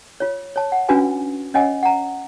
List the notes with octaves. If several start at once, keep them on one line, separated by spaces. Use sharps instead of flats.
F4 C#5
C#5 A5
F#5
C#4 D4 F4 F#4 B4 G#5
C#4 C#5 D#5 F#5 G#5
F#5 A#5